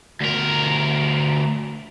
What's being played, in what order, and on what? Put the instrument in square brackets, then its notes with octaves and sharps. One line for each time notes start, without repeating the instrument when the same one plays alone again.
[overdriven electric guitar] D2 A#4